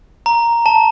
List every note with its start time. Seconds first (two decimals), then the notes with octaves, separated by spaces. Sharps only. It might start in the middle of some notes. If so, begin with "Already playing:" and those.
0.26 A#5
0.66 A5